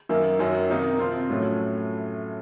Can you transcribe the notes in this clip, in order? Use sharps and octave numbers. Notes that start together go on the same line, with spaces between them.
F#2 D#3 A#3
F#2 D#3 F#3
C3 D#3 A#3 D#4
C3 F3 C4 F4
A2 F#3 A3 C#4 F4